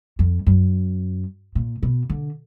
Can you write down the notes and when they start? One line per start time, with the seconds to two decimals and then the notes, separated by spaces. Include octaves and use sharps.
0.19 F2
0.46 F#2
1.55 A#2
1.83 B2
2.10 D3